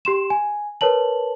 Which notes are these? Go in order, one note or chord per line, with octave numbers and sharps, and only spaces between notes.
G4 C6 E7
G#5
A#4 B4 C#5 A5 F#7